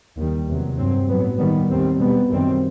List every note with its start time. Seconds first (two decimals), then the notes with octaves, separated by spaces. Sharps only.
0.17 D#2 D#3 G3
0.48 E2 C3 F#3
0.78 G2 F#3 C4
1.09 A2 F#3 B3
1.39 D#2 D#3 G3 B3
1.70 D#2 D#3 G3 C4
1.99 B2 G3 B3
2.30 F#2 D#3 G3 C4